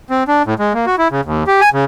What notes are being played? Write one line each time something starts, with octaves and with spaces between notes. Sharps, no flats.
C4
D4
A2
G#3
A#3
F#4
E4
C#3
D#2
G4
G#5
C#3